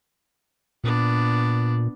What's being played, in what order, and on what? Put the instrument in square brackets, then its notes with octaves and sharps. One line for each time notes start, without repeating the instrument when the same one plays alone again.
[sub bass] A#2 [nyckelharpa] B3 D4